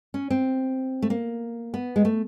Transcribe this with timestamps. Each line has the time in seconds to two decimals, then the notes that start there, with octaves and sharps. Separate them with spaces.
0.14 C#4
0.30 C4
1.02 A3
1.10 A#3
1.74 B3
1.96 G#3
2.05 A3